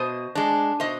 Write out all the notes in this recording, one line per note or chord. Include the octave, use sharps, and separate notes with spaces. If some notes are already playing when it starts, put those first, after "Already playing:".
Already playing: B2 C5 D#5
G#3 D4
B2 C5 D#5